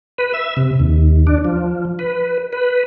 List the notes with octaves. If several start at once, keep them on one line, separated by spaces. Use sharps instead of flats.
B4
E5
C3
D#2
D4
F3
B4
B4